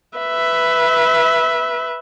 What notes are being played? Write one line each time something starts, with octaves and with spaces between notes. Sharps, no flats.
B4 E5